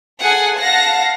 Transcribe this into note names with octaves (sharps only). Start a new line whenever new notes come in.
G#4 A4 F#5 G#5
F5 F#5 A5 A#6